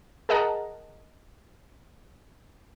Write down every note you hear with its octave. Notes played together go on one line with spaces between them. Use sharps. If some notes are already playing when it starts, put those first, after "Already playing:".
G#4 A#4 D#5 F#5 A5 A#5